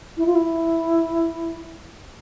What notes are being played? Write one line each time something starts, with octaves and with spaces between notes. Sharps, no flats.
E4
F4
E4